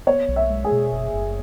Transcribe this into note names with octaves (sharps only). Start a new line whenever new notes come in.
B3 C#5
B1
E5
G#3
G#4
B2
F#1
F#1